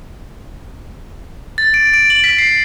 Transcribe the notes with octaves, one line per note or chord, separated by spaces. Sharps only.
A6
D7
D7
F#7
B6
C7